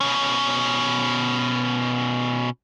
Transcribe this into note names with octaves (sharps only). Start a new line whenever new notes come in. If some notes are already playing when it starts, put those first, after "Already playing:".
B2 C#4